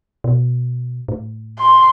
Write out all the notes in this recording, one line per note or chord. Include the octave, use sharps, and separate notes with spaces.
B2
A2
C6